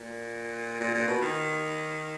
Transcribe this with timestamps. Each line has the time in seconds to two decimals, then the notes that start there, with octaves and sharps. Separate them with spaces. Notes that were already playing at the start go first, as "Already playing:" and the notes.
Already playing: A#2
0.80 A#2
0.94 A#2
1.07 B2
1.21 D#3